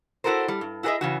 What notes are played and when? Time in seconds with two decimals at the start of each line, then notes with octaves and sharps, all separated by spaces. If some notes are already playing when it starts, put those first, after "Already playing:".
0.24 E4 F#4 A4 A#4 C5
0.48 G3
0.61 G2
0.83 E4 F#4 G#4 A#4 D#5 E5
1.01 C#3 E3 F#4